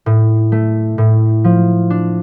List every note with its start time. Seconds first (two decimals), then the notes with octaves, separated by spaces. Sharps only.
0.06 A2
0.52 A3
0.98 A2
1.44 F3
1.90 D4